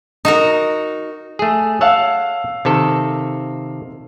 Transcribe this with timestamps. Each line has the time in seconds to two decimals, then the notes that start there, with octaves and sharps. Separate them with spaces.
0.25 D#4 F#4 A#4
1.39 A3 G#4
1.81 C#5 F5 F#5 A5 E6
2.65 C3 D#3 A4